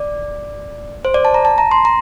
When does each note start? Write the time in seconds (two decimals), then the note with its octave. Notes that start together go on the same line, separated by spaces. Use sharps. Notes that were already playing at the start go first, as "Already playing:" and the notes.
Already playing: D5
1.05 C5
1.14 D5
1.25 A5
1.34 A#5
1.45 A5
1.58 A#5
1.71 C6
1.85 A#5